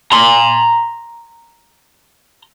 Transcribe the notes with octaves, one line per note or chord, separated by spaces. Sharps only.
A#5 C6